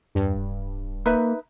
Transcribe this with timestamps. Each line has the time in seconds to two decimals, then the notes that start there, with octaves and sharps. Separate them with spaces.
0.15 E2 G2
0.36 D1
1.06 A#3 D#4 B4 E5